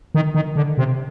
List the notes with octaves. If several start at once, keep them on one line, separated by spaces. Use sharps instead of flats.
D#3
D#3
D3
C3